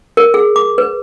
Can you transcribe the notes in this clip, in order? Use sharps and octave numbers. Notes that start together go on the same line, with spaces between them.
A#4
G#4
D6
B4